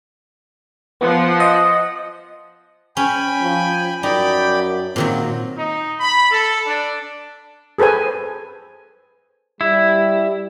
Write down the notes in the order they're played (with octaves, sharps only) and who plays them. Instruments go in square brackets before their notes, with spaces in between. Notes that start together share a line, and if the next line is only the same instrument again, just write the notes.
[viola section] F3 F#5 [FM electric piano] B3
[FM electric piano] D#5
[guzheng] C#4 [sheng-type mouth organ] G5 G#5 B5
[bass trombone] F3
[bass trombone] F#2 [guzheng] D#4 [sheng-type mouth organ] D5 G5 B5
[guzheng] A#2 D#3 F#3 [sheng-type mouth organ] C4
[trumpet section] D#4
B5
A4
D4
[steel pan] G#4 A4 B4 C5 G#5
[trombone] G3 [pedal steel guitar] E4